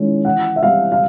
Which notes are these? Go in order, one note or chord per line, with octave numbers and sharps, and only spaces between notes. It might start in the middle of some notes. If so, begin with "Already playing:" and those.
Already playing: D#3 G#3 C#4 E4
E3 F#5
E5
G3 C4 F5
F5